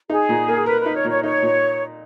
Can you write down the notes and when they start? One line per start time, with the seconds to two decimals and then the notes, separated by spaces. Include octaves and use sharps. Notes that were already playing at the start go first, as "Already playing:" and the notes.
0.10 D#4 G#4
0.29 A#2
0.48 A#3
0.66 A#4 B4
0.80 B4
0.86 D#4
0.96 C#5
1.04 A#2
1.10 C#5
1.23 D#4 C#5
1.42 A#2